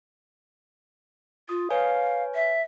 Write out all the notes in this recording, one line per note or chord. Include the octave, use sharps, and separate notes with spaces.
F4 D#6
B4 C#5 F5 G#5
E5